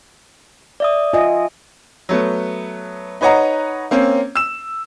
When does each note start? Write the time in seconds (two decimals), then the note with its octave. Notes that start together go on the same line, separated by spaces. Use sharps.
0.80 D5 E5 D#6
1.13 F4 D#5 E5 G#5
2.09 F#3 A3 B3
3.21 D#4 B4 C#5 D#5 F#5 A#5
3.91 A#3 C4 C#4
4.35 E6 E7